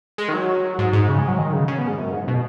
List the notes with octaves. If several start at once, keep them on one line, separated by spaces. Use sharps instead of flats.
G#3
D#3
F#3
G#2
G#2
C#3
G#3
F#3
D#3
C#3
C#3
B2
G#2
F#2
G#2
B2